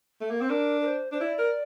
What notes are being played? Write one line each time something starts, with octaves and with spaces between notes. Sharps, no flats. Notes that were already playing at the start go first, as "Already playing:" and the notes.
A3
A#3
C4 C5
D4 A#4
A#4
C5
D4 C5
E4 D5
A#4